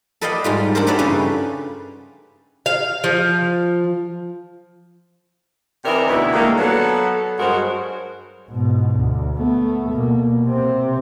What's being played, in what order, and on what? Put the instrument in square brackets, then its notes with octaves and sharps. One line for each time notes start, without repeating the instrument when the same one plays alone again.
[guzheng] A4 B4 D5 D#5 F5 G5
G#2 G3 F4
D4 G4 A4 A#4 C5
F#4 G4 B4 C#5 D5 E5
G2 C#3 C#4 F4 B4
[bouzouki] F5
F3
[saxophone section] C3 E3 D#4 A#4 D5 E5
D2 B2 A3 B3 E4
A#2 D3 D#3 G3 G#3 A#3
F#3 B3 A4
G2 F#3 G#3 F#4 A#4 C5
[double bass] G#2 B2
D2
A3 B3
B2 A#3
C3 C4